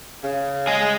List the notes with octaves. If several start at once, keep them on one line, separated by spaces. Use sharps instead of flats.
C#3
G#4 D#5